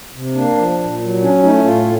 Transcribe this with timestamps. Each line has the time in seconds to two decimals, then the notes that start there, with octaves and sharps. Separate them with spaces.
0.14 C3
0.35 A#3 D4
0.57 F3
0.78 A#2
1.00 F#3
1.22 C#4 D4
1.43 A3 D#4
1.53 E4
1.64 A2 F4